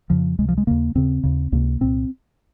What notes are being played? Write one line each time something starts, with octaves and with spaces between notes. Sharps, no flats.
F2 C#3 F3
C#2 C3 G#3
F3
G#3
D#2 C#3 A#3
D#2 C#3 C4
D#2 C#3
C#2 C3 A#3
C2 A#2 C4